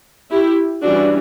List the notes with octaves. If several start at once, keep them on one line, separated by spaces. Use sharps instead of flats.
E4 G4
E3 G3 C#4 D4 F#4